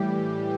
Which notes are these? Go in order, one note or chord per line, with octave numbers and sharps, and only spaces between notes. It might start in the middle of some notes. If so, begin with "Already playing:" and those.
Already playing: A2 E3 G3 G4